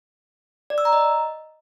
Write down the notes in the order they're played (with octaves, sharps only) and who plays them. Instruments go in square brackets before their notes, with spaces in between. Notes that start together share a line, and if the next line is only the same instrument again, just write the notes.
[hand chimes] D5
E6
A#5
D#5